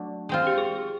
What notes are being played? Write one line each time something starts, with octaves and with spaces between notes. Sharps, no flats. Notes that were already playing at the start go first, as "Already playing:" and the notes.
Already playing: F#3 A3 D4 D5
G#3 C4 F4
G4
G#4